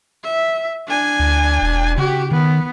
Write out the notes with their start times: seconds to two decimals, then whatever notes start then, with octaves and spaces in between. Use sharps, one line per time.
0.24 E5
0.87 D4 G#5
1.20 D2
1.62 E1
1.98 C#3 F#4 G4
2.32 D#3 B3